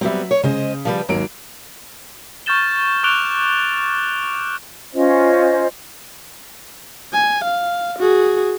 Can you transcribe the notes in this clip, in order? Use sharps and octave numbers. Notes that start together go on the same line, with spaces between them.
F#3 G3 B3 C4 E5
C#5
C#3 G#3 C5 D#5
F3 G3 B4
G#1 D#2 F#3 D7
C#6 F6 G6 A6 E7 G7
C#6 D6 F#6 D7 F7 G7
C#4 F4 C5 D#5
G#5
F5
F#4 G#4